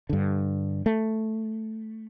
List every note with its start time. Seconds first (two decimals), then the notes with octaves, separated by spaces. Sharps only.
0.09 G2 D3
0.86 A3